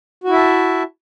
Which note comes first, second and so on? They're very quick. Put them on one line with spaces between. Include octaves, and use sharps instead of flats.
F#4 E4 E5 A5